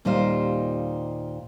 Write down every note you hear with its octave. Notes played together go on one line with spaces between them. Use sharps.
D#2 A#2 G3 D#4 F4 C5